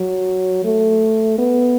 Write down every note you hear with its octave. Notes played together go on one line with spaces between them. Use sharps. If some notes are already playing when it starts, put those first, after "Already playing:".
Already playing: F#3
A3
B3